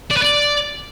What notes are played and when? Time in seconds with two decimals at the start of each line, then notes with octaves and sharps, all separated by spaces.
0.11 D5
0.17 B4
0.22 D5